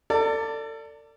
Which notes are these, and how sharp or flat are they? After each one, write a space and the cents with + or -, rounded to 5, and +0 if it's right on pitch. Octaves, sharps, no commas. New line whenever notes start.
A4 +35 D5 -5